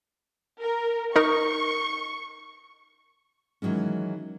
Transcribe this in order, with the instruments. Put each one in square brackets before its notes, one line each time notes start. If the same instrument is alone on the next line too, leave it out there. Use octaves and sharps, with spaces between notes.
[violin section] A#4
[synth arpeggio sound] D#4 A#4 [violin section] C#6
[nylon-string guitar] D#3 E3 F#3 G#3 C#4